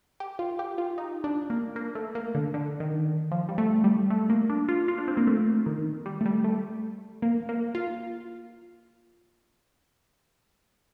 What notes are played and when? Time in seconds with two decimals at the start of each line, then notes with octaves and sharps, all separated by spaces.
0.20 G4
0.39 F4
0.59 G4
0.78 F4
0.98 D#4
1.24 D4
1.50 A#3
1.76 A#3
1.95 A3
2.15 A#3
2.35 D3
2.54 D3
2.80 D#3
3.31 F3
3.49 G3
3.58 A3
3.84 G3
4.10 A3
4.30 A#3
4.50 D4
4.68 F4
4.88 F4
4.98 D4
5.08 C4
5.17 A#3
5.27 A3
5.66 D#3
6.06 G3
6.21 A3
6.25 G3
6.44 A3
7.22 A#3
7.49 A#3
7.75 F4